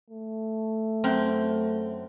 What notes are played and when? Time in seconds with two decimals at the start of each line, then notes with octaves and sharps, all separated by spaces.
0.10 A3
1.04 F#2 C4